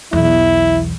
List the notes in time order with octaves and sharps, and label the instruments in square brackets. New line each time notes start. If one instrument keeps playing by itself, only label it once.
[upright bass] B1 E2 [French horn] E4